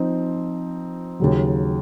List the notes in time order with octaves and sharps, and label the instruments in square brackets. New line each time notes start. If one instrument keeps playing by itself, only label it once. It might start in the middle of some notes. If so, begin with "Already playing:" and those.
Already playing: [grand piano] F3 C4 D#4
D#2 C#3 F#3